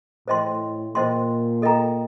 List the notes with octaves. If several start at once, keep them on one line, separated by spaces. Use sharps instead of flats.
A2 C5 D#5 G5 C6
A#2 C5 D#5 G5 C6
A4 D#5 G5 A#5